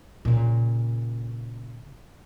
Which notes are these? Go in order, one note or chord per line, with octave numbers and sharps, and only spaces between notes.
A#2 C#3